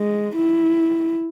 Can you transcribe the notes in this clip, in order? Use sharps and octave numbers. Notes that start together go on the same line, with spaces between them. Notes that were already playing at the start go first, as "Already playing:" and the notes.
Already playing: G#3
E4